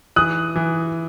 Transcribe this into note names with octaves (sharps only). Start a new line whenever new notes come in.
E3 D#6 F#6
E3